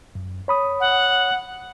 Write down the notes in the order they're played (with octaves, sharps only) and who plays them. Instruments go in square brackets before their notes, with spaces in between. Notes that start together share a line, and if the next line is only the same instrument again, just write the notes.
[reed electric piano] F#2
C#5 B5 D#6
[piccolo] F#5